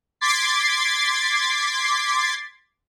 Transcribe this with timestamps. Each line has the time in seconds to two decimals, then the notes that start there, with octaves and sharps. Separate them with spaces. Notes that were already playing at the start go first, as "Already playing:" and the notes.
0.21 C6 D6 G#6 A6 B6 C7